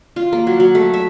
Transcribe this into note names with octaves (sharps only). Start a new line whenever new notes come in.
F4
A#3
F#3
F#3
A3
E5